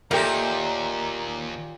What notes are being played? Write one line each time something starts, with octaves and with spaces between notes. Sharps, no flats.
D#2 A#2 A3 G4 A#4 C5 A#5